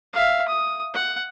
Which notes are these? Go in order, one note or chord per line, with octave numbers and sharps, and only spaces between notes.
E5 F5
D#6
F#5